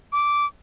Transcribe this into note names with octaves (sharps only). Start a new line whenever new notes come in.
D6